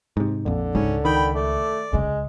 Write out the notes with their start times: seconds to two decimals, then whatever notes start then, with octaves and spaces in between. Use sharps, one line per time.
0.17 G#2 C3
0.46 A#1 F2 D3
0.75 C#2 G#2 C#4
1.05 D#3 G5 B5
1.34 A3 D5
1.93 C#2 C#3 G#3